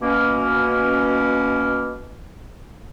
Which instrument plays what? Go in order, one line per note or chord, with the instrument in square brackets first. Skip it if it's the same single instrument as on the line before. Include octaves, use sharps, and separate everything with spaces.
[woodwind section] B2 A#3 C#4